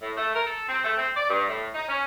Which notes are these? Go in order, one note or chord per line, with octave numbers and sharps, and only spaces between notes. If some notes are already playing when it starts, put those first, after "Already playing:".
A2
A3
A#4
A4
C4
A3
C4
D5
G2
A2
D#4
C#4